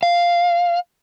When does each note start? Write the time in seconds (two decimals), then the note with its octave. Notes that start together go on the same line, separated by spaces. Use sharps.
0.03 F5